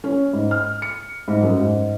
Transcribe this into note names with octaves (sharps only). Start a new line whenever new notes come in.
C#4
G#2
F6
C#7
G#2
F#2
G#2